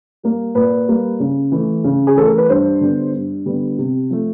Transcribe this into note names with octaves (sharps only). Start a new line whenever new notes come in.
G3 A#3
A#2 B4
G3 A#3
C#3
E3 A3
C#3
G#4
E3 A3 A4
A#4
B4
G2 C5
D3 G3 B3
G2
D3 G3 B3
C3
F3 A3